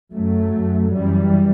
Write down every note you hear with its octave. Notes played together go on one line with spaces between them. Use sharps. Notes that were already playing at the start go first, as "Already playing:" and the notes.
F#2 F#3 A3
F#2
F#2 E3 G3